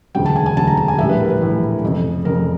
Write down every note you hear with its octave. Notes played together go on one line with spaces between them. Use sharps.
E1 D2 C#3 F#3 G5
A5
G#5
G#5
E1 D2 C#3 F#3 A5
A#5
A5
G#5
A#1 A2 E3 G3 E5
B4
A#4
B4
A#1 A2 E3 G3
F1 F2 C#3
F1 F2 C#3 A#4